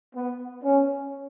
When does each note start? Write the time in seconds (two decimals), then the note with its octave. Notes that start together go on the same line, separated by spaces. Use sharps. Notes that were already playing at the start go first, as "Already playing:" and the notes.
0.15 B3
0.63 C#4